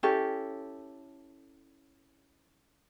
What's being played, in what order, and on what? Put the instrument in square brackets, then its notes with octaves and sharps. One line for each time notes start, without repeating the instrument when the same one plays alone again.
[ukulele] C#4 E4 G4 A4